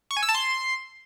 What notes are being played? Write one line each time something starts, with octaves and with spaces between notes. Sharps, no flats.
C#6
G#5
E6
A5
C6